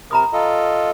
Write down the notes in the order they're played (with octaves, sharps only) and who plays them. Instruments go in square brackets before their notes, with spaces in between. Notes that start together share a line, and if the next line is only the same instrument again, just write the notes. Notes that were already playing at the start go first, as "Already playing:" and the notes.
[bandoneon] C3 A#4 [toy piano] A#5 B5 D#6
[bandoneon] F4 A4 D#5